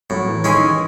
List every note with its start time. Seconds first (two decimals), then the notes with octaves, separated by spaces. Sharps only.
0.10 A2 F#3
0.27 E3
0.44 D#3 G#3 C#4 E4 G#4
0.61 E3